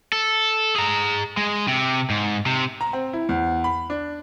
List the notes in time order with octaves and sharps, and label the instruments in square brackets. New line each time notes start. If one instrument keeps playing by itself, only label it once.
[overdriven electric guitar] A4
G#4 A#5
G#3
C3
G#2
C3
[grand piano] A#5
C4
E4
E2
B5
D4